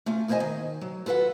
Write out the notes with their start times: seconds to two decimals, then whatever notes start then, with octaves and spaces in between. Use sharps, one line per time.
0.06 A3 C#4 F4
0.28 E2 E4 C5 C#5 D#5 G#5
0.40 D#3
0.81 F#3
1.06 F4 A4 B4 E5 F#5